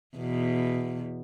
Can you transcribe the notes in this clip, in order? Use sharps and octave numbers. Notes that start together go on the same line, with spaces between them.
E2 B2